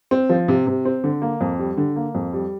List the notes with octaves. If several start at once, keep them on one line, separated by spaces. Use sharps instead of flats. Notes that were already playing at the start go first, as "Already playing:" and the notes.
C4
F3
C3
C3
C4
D3
A#3
F2
G3
D3
A#3
F2
G3